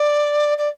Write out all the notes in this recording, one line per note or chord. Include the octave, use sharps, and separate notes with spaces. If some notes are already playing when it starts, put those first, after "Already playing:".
Already playing: D5
D5